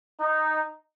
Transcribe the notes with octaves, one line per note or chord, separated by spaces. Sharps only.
D#4